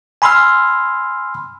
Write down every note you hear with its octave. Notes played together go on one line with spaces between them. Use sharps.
G#5 B5 C6 E6 F6